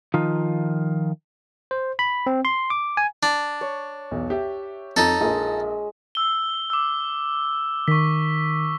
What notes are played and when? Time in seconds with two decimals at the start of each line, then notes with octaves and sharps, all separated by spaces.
0.14 D#3 F3 D#4 F4
1.71 C5
1.99 B5
2.27 C4
2.45 C6
2.70 D6
2.97 G#5
3.23 D4
3.61 C#5
4.11 B1 E2
4.30 G4 E5
4.96 F2 D#4 A4
5.21 A#1 G#3 F4 A#4 D#6 E6
6.15 E6 G7
6.70 D6 E6
7.88 D#3 C#6 B6